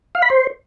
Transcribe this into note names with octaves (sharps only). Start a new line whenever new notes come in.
F5
B5
C5